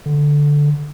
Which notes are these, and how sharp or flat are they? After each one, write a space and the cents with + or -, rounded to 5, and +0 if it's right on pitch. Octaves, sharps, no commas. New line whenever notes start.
D3 -5